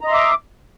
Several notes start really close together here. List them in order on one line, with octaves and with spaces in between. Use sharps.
A#5 D#5 C6 E5 D6